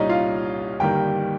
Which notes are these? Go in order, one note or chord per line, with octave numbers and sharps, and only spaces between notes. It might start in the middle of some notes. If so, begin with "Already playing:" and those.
Already playing: C2 A#2 G3 C#4 D#4 C#5 D#5
F4 F5
G1 G2 D#3 G3 A#3 G4 G5